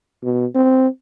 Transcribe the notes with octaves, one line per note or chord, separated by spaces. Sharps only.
B2
C4